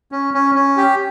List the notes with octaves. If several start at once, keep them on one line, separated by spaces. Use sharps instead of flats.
C#4
C#4
C#4
G4